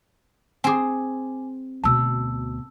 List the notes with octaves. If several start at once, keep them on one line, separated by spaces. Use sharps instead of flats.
C4 G#4 G#5 D6
D2 B2 A5 E6